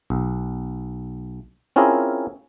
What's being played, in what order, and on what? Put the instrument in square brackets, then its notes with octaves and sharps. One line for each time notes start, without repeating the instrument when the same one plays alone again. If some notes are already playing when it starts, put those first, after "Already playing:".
[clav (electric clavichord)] B1
C4 C#4 E4 F4 G#4 A#4